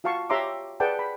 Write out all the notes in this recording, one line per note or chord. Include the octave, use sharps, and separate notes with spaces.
F4 F#4 F5 A5 C#6
G4 C#5 E5 A#5 C6 D6
G#4 B4 D5 F#5 G5 A5
B5